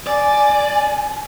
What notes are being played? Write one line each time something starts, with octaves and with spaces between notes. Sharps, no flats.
D5 G#5